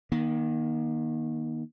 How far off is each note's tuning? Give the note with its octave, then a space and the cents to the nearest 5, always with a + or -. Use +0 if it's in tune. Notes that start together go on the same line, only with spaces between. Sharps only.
D#3 +0 A#3 +35